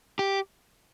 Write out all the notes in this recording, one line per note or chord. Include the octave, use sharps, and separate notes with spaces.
G4